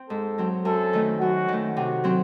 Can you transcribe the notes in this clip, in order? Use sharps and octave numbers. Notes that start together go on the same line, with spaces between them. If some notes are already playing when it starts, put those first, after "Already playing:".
Already playing: C4
G#2 A4
F#3 C4
F#2 A4
D#3 A3
F#2 F#4
D#3 A3
C3 F#4
F#3 C4